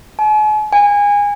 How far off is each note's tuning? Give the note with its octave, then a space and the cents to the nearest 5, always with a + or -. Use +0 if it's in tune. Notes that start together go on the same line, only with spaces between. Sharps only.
G#5 +45
G#5 -25